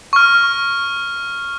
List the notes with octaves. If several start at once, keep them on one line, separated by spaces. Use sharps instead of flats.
C#6 F6